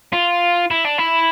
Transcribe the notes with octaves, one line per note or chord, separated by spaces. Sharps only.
F4
E4
D4
E4